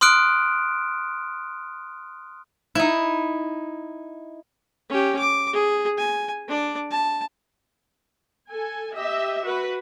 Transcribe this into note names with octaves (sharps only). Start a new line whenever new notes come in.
C6 D#6 F6 F#6 D7
D#4 E4
C#4 G4
D6
G#4
G#5
D4 D5
A5
A4 G#5
G4 D#5 E5
F#4 B4